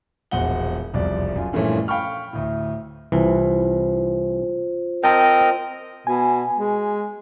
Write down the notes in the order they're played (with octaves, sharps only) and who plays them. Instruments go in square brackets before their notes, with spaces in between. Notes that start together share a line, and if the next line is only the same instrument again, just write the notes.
[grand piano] E1 A#1 F#5 G7
E1 C2 F2 D5
F#2 F4
G2 A#2 E3 F3 A3 C#4
F5 G5 B5 C#6 F6
D2 A2
[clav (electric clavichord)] C2 E3 [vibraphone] F4 C5
[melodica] C4 A#4 D#5 [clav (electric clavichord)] G5 A5
[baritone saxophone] B2 [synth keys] G#5
[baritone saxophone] G#3